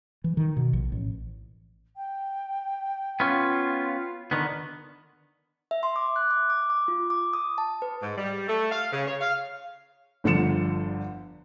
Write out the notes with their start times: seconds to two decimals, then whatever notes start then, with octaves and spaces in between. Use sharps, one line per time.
0.24 E3
0.37 D#3
0.57 B2
0.73 A#1
0.92 A1
1.96 G5
3.20 B3 C#4 F4
4.31 D3 D#3 B3 D5
5.71 E5
5.83 C6
5.96 D6
6.16 F#6
6.31 D6
6.50 D6
6.70 D6
6.88 F4
7.10 D6
7.33 D#6
7.58 A5
7.82 B4
8.01 G#2
8.16 G3
8.47 A3
8.71 F5
8.91 C#3
9.06 C#5
9.20 F5
10.24 G1 D3 F3 C#7 E7